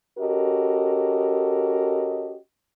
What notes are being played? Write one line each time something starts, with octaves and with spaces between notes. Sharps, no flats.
C#4 F#4 G4 A4 A#4 D#5